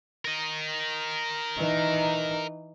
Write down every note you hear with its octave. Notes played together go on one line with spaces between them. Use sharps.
A#4 D#5
E3 D#4